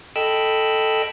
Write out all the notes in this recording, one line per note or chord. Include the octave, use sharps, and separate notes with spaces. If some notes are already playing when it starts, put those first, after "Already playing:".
A4 D#5 G5 B5 E6